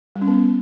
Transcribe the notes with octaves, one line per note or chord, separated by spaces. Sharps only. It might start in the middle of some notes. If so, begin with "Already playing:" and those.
G3
C#4
B3